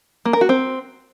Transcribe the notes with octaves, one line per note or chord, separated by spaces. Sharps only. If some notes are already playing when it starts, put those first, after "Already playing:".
A#3
A#4
F#4
C4